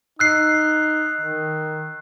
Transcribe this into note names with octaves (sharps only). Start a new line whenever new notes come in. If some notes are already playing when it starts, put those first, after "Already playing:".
D#4 E6 F#6 C7
D#3